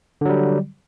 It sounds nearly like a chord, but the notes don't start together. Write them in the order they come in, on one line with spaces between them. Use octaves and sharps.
D3 F#3 G3